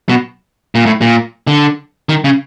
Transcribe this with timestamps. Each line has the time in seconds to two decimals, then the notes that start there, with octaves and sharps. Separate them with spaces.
0.09 B2
0.75 A#2
0.86 A2
1.01 A#2
1.47 D3
2.09 D#3
2.24 C#3